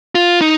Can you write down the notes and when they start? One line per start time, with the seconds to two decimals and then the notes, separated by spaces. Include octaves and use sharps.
0.15 F4
0.41 D#4